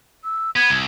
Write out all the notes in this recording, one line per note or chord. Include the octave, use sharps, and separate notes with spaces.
E6
B3 G#6
C2